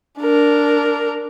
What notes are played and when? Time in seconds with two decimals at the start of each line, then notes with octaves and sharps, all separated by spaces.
0.19 D4 A#4